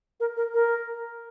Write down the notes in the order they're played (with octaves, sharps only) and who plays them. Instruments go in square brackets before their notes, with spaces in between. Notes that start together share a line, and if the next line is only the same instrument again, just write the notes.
[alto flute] A#4
A#4
A#4